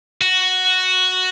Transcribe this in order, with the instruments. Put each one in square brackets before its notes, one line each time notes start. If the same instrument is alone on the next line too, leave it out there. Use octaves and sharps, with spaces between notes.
[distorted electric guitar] F#4